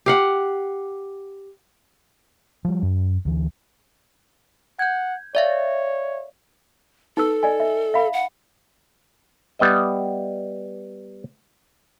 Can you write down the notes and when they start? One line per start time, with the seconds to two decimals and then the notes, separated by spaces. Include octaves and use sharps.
0.06 G4 F5 F#5
2.65 F3 G3
2.82 F#2
3.25 D2 E3
4.79 F#5 G6 G#6
5.35 C#5 D5 E5 F5
7.17 D#4 A4 B4 E6
7.43 D5 D#5 G#5
7.60 E5
7.94 E5 F5 B5
8.13 F#5
9.59 G3 B3 D#5 E5